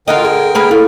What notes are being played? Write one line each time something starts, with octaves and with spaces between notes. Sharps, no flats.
D3 F4 F#4 A#4 D#5 G5
G#4
A#3 G#4 B4
E4 F4 A4